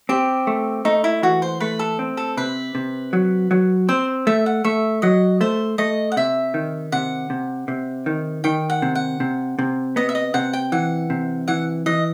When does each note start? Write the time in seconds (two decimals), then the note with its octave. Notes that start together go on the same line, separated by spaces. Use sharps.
0.09 C4 G4
0.47 A3
0.85 A3 D#4
1.04 E4
1.23 E3 F#4
1.42 C5
1.60 A3 B4
1.79 A4
1.99 C4
2.17 A4
2.37 C3 B4
2.75 C3
3.13 F#3
3.51 F#3
3.89 C4 C5
4.27 A3 E5
4.46 F#5
4.64 A3 E5
5.02 F#3 D#5
5.41 A3 C5
5.78 A3 D#5
6.12 F#5
6.17 C3 E5
6.54 D#3
6.92 C3 F#5
7.30 C3
7.68 C3
8.06 D#3
8.44 D#3 G5
8.70 F#5
8.82 C3
8.95 F#5
9.20 C3
9.59 C3
9.96 B3 D#5
10.09 E5
10.15 D#5
10.34 C3 F#5
10.53 G5
10.72 E3 F#5
11.10 C3
11.48 E3 F#5
11.86 E3 D#5